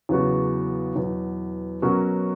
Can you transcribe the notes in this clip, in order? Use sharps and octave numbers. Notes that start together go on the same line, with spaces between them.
E2 C#3 F#3 B3 F#4
E2 B2 F#3
B2 F#3 C#4 F#4 A#4